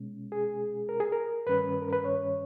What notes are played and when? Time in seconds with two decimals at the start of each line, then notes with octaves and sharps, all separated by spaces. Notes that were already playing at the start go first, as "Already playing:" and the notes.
Already playing: B2 G#3 C#4
0.32 G#4
0.89 A#4
1.00 G#4
1.12 A#4
1.46 G2 D#3 G3 C#4 B4
1.82 A#4
1.93 B4
2.04 C#5